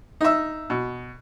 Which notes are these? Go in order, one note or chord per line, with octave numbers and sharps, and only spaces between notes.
D#4 E5
B2